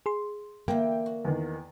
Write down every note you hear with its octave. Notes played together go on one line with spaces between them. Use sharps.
G#4 C6
D3 E3 A#3 G5
F#4
E2 D#3